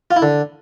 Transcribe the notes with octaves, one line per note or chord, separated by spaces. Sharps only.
F4
E4
D3